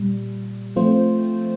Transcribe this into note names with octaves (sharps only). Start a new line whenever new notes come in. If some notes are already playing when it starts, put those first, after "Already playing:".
Already playing: A#2 G3
F3 A3 C4 F4 C5